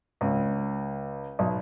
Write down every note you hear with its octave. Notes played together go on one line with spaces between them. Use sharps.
C#2
B1